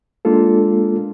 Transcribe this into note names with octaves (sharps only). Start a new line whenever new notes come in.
G#3 A#3 D4 F4 A4